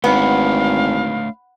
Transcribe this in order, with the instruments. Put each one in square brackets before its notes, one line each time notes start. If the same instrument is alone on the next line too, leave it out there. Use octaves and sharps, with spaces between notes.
[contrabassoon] G#1 [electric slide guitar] A3 D4 C#5 [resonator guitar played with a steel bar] B3 [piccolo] F5